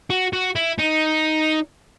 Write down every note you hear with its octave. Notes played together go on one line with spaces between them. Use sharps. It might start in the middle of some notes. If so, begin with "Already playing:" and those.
F#4
F#4
E4
D#4